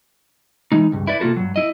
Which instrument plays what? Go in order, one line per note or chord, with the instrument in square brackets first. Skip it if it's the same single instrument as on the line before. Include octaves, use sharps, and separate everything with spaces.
[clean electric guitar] E3 G#3 D#4
C#2 G2
E4 B4 D5
C3 A#3 F4 F#4 A4
G2 F#3
E4 D#5